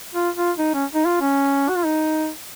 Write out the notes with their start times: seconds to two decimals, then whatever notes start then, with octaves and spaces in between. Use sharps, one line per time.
0.15 F4
0.36 F4
0.58 D#4
0.74 C#4
0.95 D#4
1.06 F4
1.21 C#4
1.69 F#4
1.77 F4
1.85 D#4